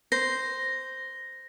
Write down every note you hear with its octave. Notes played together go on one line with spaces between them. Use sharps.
C5 A#6